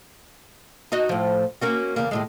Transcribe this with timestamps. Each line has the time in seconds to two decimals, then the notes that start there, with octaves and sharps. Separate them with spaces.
0.92 D#4 F#4 D#5
1.09 A2 F3
1.61 A#3 C#4 F#4
1.96 E2 C#3 A#3
2.11 D#2 A2 G#3